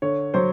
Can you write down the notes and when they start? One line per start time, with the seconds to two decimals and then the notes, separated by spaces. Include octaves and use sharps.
0.02 D3 C#5
0.34 F#3 C5